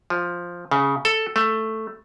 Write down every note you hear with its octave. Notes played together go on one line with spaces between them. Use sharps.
F3
C#3
A4
A3